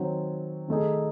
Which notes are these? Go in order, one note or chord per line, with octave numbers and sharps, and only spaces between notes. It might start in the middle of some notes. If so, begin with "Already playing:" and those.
Already playing: D#3 F#3 C4 F#4 C#5
D#3 A3 D#4 G#4